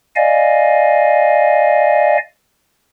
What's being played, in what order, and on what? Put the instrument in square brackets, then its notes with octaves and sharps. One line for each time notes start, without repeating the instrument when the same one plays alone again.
[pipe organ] D5 D#5 F5 G#5